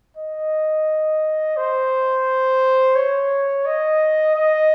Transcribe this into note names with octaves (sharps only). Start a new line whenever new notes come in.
D#5
C5
C#5
D#5
D#5